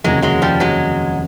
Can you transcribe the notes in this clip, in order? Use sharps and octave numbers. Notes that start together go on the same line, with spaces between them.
F1 D#2 C#3 F#3 G#3
F#3 G#3
F3 G3
F#3 G#3